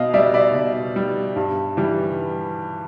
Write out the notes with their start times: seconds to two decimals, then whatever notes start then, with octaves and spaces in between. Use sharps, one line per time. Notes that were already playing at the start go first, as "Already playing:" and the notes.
Already playing: B2 D#5 F5
0.14 G3 D5 E5
0.34 D5 E5
0.54 B2
0.96 G3
1.36 G2
1.77 E3 G3